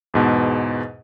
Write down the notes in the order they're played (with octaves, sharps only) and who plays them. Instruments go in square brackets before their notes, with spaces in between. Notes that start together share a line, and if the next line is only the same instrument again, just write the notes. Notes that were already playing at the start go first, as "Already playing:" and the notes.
[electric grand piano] E2 G#2 B2